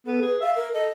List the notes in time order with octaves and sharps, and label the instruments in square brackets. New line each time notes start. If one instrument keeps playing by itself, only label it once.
[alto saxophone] B3 [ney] A4
[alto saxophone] G#4 [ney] B4
[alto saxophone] E5 [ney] F5
[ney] A#4
[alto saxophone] A4 [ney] D#5